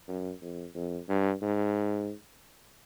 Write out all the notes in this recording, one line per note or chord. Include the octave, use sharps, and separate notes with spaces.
F#2
F2
F2
G2
G#2